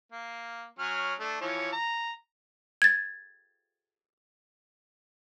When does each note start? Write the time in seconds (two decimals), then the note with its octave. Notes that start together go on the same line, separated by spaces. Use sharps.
0.12 A#3
0.79 F#3 C#4 F6
1.20 A3 D4
1.41 E3 F3 C#5
1.73 A#5
2.82 G#6 A6